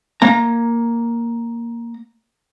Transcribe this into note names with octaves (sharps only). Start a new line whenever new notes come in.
A#3 A#5